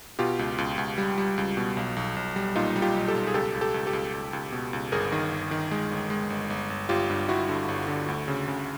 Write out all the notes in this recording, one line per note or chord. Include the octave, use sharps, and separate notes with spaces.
B2 F4 G4
C#2
C#2
C#2
G3
G3
C#2
B2
B1
B1
B1
G3
A#2 D#4 F4
G3
F4 G4
B1
G4 A4
B1
G#4
C#2 G4 A4
C#2
G4 A4
C#2
G4 A4
C#2
C#2
C#2
B2
C#2
G1 G#4 A#4
D#3
G1
D#3
G#3
G1
G#3
G1
G1
G1
G1 F4 G4
G2
G1 E4 F#4
D3
G1
D3
D2
C#3
C#3